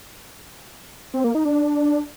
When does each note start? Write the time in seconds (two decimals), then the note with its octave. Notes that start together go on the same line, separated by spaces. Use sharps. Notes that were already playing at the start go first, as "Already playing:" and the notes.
1.14 C4
1.24 A#3
1.35 D#4
1.45 D4